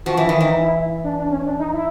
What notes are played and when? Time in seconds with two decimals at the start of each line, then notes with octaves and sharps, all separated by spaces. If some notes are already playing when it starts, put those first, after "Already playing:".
0.06 F3 F#4
0.17 E3
0.25 E4
0.29 D#3
0.41 E3 D#4
0.62 E4
0.76 E4
1.04 D4
1.18 D4
1.31 C#4
1.46 D4
1.59 D#4
1.73 E4